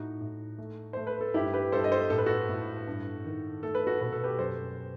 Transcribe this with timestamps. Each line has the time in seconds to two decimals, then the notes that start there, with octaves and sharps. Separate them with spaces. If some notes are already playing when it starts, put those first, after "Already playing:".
Already playing: A2 D#4 F#4
0.21 A2
0.58 A3
0.93 A3 C5
1.07 B4
1.21 A4
1.34 G2 E4 G4
1.54 G4 B4
1.72 G2 A4 C5
1.84 D#5
1.92 A4 C5
2.10 A2 A4
2.18 B4
2.26 F#4 A4
2.49 A2
2.87 G2
3.25 D#3
3.63 A3 A4
3.75 B4
3.87 F#4 A4
4.01 B2 B4
4.12 A4
4.24 G4 B4
4.39 F#2 A4 C5